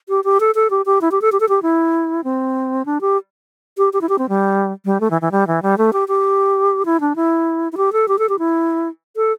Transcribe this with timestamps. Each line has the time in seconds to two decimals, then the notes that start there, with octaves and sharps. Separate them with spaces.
0.09 G4
0.24 G4
0.40 A4
0.55 A4
0.70 G4
0.86 G4
1.01 E4
1.11 G4
1.22 A4
1.32 G4
1.40 A4
1.49 G4
1.62 E4
2.24 C4
2.86 D4
3.01 G4
3.78 G4
3.93 G4
4.01 E4
4.09 G4
4.18 C4
4.29 G3
4.85 G3
5.01 A3
5.11 E3
5.21 E3
5.32 G3
5.47 E3
5.62 G3
5.78 A3
5.93 G4
6.08 G4
6.85 E4
7.00 D4
7.16 E4
7.72 E4
7.77 G4
7.93 A4
8.08 G4
8.19 A4
8.29 G4
8.39 E4
9.16 A4